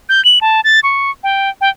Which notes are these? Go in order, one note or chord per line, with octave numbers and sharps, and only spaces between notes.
G6
F#7
A5
A6
C#6
G5
G5